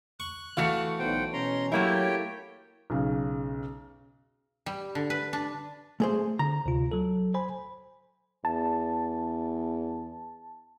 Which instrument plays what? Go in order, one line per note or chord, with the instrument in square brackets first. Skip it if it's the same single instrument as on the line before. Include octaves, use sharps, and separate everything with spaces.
[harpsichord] C#6 [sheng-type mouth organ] F#6
[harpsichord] E3 [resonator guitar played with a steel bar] A3 F#4 F5
[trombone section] B1 [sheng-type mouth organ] C5 F#5 G5
[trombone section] B2 C#4 [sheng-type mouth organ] A#5 C6
[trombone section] F#3 [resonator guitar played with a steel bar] A3 A#3 E4 [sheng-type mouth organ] G4 C#5 G5
[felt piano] B1 C#3
[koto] G3
D3
B4
D4
[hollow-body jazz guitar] A3 G#4 C5
[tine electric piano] D3 [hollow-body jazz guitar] A#5
[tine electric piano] D2 C3 F4
F#3 A4
C5 G#5 B5
[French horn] E2 [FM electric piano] A5